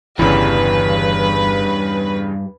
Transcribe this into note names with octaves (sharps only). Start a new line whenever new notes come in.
G1 E2 G2 C#3 E3 B4